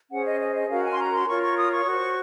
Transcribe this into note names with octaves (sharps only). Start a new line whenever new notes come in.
C#4 G#4 C5 F#5
D#5
D#5
D#5
C#4 F#4 A#4 F5
G#5
C6
A#5
C6
F4 A#4 C#5 C#6
C#6
D#6
C#6
F#4 C5